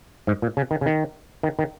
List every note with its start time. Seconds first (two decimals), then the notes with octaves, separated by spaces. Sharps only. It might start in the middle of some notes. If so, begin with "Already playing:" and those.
0.27 G#2
0.42 A#2
0.57 C#3
0.71 D#3
0.81 C#3
0.86 D#3
1.43 D#3
1.59 D#3